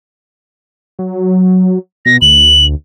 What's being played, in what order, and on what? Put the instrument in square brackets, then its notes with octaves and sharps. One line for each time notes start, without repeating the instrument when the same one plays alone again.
[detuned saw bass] F#3
[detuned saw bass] B2 [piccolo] A#6
[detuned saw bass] D2 [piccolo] F#7